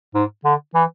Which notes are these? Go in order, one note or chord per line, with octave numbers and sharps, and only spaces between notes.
G#2
D3
E3